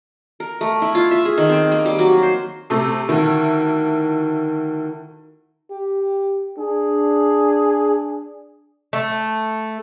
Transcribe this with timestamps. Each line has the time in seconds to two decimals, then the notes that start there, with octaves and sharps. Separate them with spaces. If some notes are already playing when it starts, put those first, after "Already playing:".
0.40 A#4
0.61 A3
0.82 E4
0.95 F4
1.11 E5
1.25 G#4
1.37 D#3
1.49 C4
1.72 A#3
1.85 G3
1.99 F#3
2.23 C5
2.70 C3 A3
3.09 D2 D#3 E4
5.71 G4
6.59 D4 G#4
8.93 A3